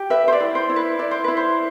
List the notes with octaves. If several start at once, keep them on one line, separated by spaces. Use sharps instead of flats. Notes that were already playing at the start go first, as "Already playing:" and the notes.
Already playing: G4
B4 E5
C5
D5
E4
C5
E4
B4
E4 D5
C5
E4 B4
C5